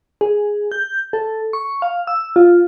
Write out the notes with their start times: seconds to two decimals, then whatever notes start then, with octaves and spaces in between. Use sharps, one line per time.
0.21 G#4
0.72 G6
1.13 A4
1.53 C#6
1.82 F5
2.07 E6
2.36 F4